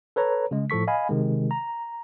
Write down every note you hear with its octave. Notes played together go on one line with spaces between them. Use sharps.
A4 B4 C#5 A#5
C#3 G#3
A2 F3 A4 C#6 B6
D#5 F5 G#5 B5
C3 D#3 G#3
A#5